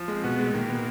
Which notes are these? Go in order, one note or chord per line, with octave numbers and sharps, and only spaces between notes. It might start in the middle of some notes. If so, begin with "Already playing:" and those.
Already playing: F3
G#3
C4
B2 B3 F#4
G#3 A3
A#2 D#3 A#3
B3